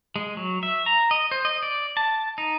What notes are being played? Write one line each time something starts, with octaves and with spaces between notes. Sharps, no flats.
G#3
F#3
E5
A#5
D#5
C5
D#5
D5
A5
D#4